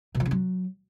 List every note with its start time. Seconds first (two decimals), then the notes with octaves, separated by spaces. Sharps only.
0.15 B2
0.20 F3
0.25 C#3
0.31 F#3